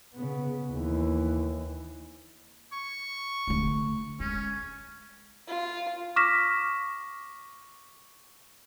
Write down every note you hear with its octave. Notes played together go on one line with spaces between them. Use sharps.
C#3 B3
D#2 E3
C#6
D3 A3
G#3 C#4
F4
C#6 D6 F6 A#6 B6 E7